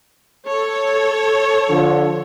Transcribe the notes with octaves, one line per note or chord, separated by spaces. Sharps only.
A4 C#5
D3 F3